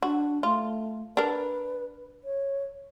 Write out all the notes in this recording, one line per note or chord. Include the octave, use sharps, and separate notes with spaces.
D4 F#4
A3 F4
D4 A#4 B4
C#5